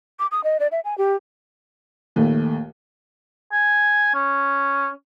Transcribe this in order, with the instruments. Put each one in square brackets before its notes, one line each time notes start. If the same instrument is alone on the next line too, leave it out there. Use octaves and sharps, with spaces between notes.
[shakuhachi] D6
D#6
D#5
D5
E5
G#5
G4
[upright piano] A#1 D#2 A3
[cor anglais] G#5
C#4